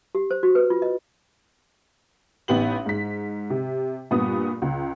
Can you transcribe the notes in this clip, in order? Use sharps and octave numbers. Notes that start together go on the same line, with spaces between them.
G4
C5
F#4
B4
F4
D#5
A1 B3 D#4 G4 F#7
G#2 B6
C3
G2 A#2 B3 D#6
C#2